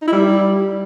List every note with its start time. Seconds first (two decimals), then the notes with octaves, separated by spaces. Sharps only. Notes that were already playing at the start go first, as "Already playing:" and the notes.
0.02 D#4
0.07 E4
0.13 G3